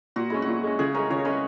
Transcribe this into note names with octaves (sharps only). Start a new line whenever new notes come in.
A#2 F#4
G#3 C#4 E4
F#4
A#2
G#3 C#4
C#3 G#4
G#3 C#4 A#4
C#3 C#5
G#3 C#4 B4